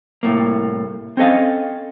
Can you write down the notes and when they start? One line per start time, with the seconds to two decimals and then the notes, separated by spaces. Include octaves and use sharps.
0.23 C2 A2 A#3
1.17 C4 C#4 A4 D#5 F5